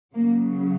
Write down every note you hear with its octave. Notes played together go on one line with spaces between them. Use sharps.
C#3 F#3 A#3